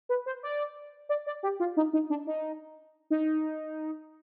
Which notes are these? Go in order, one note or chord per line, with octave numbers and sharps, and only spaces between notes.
B4
C5
D5
D5
D5
G4
F4
D#4
D#4
D4
D#4
D#4